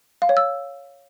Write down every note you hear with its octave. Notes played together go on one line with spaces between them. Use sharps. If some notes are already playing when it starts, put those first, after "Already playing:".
F5
C#5
E6